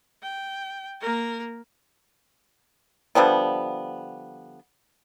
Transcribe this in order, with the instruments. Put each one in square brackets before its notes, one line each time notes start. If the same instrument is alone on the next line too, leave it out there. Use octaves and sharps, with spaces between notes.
[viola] G5
A#3 A#4
[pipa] D3 F3 G3 B3